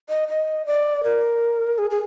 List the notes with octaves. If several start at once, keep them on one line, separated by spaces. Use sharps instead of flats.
D#5
D#5
D5
A#4
G#4
G#4